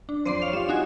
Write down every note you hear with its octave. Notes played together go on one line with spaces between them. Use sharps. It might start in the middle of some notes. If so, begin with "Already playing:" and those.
D4
F2 C5 D5 C6 D#7
C#5 F5 F7
G3 F4 E7
D#4 F#4 G#5